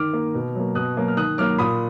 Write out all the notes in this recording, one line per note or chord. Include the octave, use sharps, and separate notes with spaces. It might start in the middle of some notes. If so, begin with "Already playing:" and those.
Already playing: D#3 D6 F6
A#3
B2
F#3 A#3
B2 D#6 F#6
F#3 A#3
F6
D#3 D#6 F#6
F#3 A#3 D6 F6
A#2 B5 D#6